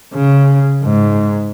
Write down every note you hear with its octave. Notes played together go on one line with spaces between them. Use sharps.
C#3
G#2